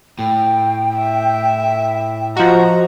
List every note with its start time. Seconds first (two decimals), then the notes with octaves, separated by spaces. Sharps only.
0.19 A2 G5
0.96 E5
2.37 F3 F#4 D#5 A#5